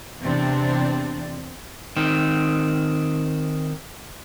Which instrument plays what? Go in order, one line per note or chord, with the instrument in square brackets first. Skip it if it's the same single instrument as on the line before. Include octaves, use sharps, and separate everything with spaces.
[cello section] E2 C3 C4 D4
[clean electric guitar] D#3 C4